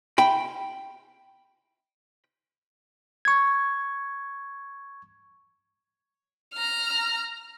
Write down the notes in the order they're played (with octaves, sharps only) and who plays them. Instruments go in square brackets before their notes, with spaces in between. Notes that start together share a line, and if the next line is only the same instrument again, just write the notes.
[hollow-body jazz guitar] G5 B5
[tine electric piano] C#6 G#6
[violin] A#5 F6